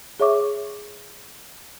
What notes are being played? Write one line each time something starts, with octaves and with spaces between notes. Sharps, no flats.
G#4 C#5 E5 C#6 D6